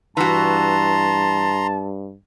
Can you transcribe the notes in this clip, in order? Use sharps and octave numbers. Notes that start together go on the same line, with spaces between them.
G2 E3 F#4 A5 A#5 C6